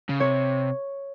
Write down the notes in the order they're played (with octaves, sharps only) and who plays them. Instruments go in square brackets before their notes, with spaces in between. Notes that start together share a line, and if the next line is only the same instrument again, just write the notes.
[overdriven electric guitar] C#3
[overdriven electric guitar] C3 [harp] C#5